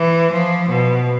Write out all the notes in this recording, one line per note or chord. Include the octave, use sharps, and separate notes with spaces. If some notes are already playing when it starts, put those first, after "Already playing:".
Already playing: E3
F3
B2